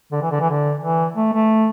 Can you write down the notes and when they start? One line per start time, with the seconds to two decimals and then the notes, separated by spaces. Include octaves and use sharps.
0.12 D3
0.22 E3
0.31 D3
0.40 E3
0.50 D3
0.81 E3
1.16 A3
1.33 A3